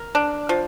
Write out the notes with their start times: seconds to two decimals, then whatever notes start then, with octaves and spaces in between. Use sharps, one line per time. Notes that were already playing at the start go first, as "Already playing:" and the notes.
Already playing: A#4
0.15 D4
0.49 F3